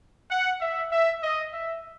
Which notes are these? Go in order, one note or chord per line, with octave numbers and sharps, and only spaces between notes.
F#5
E5
E5
D#5
E5